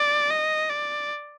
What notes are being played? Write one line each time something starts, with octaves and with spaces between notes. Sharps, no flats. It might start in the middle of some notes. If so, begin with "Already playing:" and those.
Already playing: D5
D#5
D5